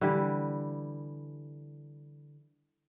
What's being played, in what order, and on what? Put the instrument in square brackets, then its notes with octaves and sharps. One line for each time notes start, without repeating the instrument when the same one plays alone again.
[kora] D3 E3 G3